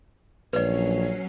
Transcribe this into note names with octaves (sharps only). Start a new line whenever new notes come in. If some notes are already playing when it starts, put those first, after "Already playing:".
A#1 F#3 C#4 B4 C#5 D5 C7